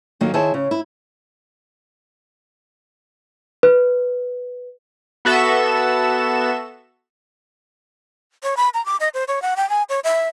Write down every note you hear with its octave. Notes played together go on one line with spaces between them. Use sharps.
D3 D#3 F#3 A#3
D#3 E4 G#4 C5 C#5 A5
C#3
E4
B4
B3 F#4 A4 E5 E7
C#5
B5
A#5
D6
D#5
C5
C#5
F#5
G5
G#5
C#5
E5